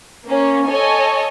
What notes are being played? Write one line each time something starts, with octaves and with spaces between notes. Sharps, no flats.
A#3 C#4
A4 C#5 D#5 G#5